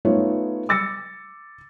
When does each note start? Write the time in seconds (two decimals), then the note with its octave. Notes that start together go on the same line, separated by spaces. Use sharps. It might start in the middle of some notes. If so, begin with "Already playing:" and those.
0.05 A3 B3 D#4 F4 B4 C#5
0.69 D6 E6 A6 A#6 C#7